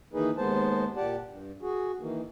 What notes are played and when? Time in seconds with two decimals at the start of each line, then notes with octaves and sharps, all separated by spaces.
0.14 D#3 E3 A#3 D#4 G#4 B4
0.37 D#2 G#3 A#3 B3 C5 A5
0.96 A#2 G4 D5 F#5 A5
1.28 G2
1.62 F#4 G#4
2.00 D#3 E3 A#3